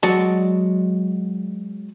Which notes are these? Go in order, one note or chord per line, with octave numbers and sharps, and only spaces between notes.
F#3 G#3 F#4 D5 D#5 A5